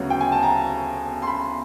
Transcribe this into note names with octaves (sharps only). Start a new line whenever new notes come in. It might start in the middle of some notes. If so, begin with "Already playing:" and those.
Already playing: D2 C#3 F#3 B3
G5
G#5
A5
A#5
C6
B5